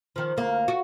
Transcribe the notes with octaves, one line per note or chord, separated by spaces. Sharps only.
D#3 F3
D2 A#3
F#4